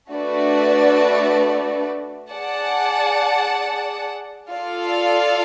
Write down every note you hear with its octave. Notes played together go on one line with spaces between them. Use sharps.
A3 D4 F#4 B4 D5
G#4 D5 F#5 A5
F4 A4 D5 F5